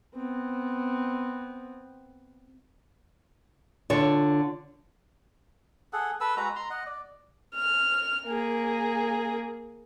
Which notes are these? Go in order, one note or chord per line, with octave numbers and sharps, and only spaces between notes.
B3 C4
D3 F4 A4 C#5
G#4 A4 F#5
A4 B4 E6
G#3 F#4 B4 A#5
A#5 C6
D#5 F#5
D5
F6
A#3 G#4